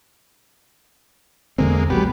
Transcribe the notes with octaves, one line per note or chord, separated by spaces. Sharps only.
E2 D3 G#3 A#3 C4
A#1 F#3 G#3 B3 G4